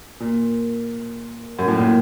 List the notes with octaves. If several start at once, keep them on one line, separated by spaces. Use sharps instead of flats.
A#2
F#2
A2
A#2